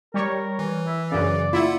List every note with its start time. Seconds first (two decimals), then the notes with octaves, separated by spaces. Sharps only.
0.14 G3 A#4 C#5
0.59 E3
0.86 E4
1.11 F#2 C#3 D5
1.53 A#3 E4 F4 F#5